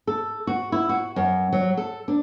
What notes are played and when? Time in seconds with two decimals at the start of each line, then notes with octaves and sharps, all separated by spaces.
0.07 A4
0.47 F#4
0.72 E4
0.89 F#4
1.16 F#2
1.53 F#3
1.77 A4
2.08 D4